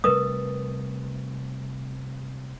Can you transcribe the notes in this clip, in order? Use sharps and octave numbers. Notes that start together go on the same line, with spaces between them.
C3 G3 A3 A#4 B4 D#6